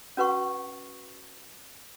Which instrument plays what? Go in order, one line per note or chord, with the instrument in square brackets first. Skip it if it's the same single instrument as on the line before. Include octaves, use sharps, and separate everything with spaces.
[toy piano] C#4 F#4 B4 F#5 C#6